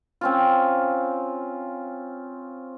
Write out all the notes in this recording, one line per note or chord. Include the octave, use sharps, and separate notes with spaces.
C4 C#4 F4